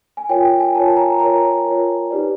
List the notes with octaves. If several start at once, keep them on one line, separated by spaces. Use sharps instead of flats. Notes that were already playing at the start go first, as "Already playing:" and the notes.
G#5
F4 A#4 C#5 G5
G5
G#5
F4 A#4 C#5 A5
A#5
F4 A#4 C#5 A#5
F4 A#4 C#5
D#4 G4 B4 D5